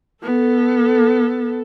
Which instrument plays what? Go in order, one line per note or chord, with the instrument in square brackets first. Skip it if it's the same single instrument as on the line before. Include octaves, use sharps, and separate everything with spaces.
[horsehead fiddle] B3 [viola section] A4